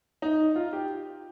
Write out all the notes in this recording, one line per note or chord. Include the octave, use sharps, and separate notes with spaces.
D#4
F4
G4